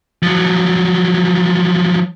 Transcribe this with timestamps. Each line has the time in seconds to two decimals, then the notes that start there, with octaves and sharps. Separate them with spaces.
0.23 F3 F#3